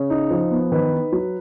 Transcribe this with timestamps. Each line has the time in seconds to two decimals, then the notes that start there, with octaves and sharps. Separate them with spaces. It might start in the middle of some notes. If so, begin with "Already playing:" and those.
Already playing: C#3 C#5
0.10 D#4
0.31 F3
0.51 B3
0.72 D#3 B4
0.93 D#4
1.12 F#3